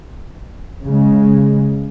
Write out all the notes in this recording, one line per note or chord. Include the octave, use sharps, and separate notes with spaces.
C#3 G#3